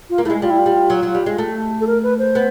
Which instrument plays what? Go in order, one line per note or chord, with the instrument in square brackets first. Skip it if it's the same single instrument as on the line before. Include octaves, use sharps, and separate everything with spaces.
[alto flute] F4
[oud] A#3
[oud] G#3 A3 [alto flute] E4
[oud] G3 [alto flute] F4
[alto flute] E4
F4
[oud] G3
F#3
F#3
G3
G#3
A3
[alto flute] A4
A#4
B4
C5
[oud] B3